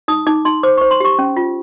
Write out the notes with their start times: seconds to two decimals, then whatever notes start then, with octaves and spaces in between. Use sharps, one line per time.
0.08 D#4 D#6
0.27 D#4 D6
0.45 D#4 C6
0.63 C5 D6
0.77 C5 C#6
0.91 C6
1.00 G4 C#6
1.19 C#4
1.37 F4